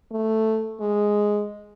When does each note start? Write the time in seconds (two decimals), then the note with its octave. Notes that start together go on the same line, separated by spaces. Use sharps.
0.11 A3
0.80 G#3